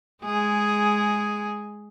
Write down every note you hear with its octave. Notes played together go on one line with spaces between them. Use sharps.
G#3 G#4